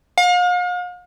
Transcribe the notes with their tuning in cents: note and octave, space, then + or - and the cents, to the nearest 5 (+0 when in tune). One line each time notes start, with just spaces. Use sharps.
F5 +40